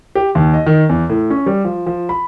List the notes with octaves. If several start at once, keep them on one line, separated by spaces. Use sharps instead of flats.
G4
D#2
D#5
D#3
E2
A2
C#4
G3
F3
F3
B5